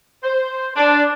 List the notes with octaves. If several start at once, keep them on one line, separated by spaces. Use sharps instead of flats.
C5
D4